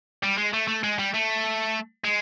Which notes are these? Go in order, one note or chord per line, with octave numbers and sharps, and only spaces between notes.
G3
G#3
A3
A3
G#3
G3
A3
G#3